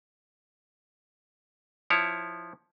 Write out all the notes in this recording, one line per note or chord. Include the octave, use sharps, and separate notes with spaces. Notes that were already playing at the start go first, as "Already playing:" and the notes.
F3 E4 C#5